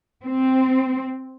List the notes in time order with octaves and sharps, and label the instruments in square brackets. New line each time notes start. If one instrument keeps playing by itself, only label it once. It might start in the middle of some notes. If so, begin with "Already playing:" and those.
[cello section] C4